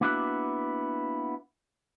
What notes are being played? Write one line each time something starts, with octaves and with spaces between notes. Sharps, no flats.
A#3 B3 D4 E4 F#4 B4